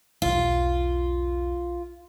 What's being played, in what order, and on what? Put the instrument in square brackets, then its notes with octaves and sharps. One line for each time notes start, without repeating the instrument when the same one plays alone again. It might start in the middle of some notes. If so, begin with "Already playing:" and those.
[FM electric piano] B1 E2 [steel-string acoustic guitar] F4